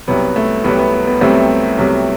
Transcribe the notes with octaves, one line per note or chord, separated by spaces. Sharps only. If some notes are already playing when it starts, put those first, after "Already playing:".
C2 C3 F#3 B3
A3
C2 C3 F#3 B3
B3
B3
B3
C2 C3 F#3 A3 C4
C2 C3 F#3